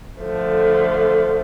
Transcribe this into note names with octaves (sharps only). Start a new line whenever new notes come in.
D3 F3 A3